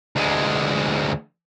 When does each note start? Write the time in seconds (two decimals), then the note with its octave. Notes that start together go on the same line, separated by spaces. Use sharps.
0.16 D2 G#3